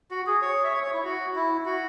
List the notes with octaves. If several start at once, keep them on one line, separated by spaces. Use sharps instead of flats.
F#4
G#4
C#5
E5
C#5
C#5
E4
F#4
E4
F#4